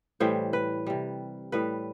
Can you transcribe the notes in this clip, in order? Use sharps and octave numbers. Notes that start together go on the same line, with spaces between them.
A2 E3 G3 C5
B4
C3 G3
A2 G3 B4